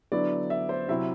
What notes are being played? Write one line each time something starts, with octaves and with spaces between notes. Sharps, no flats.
D3 F#3 B3 E4 D5
E5
C5
C3 F#3 C4 E4 E5